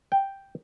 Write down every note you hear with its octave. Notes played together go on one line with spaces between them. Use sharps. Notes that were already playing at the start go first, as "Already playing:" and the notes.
G5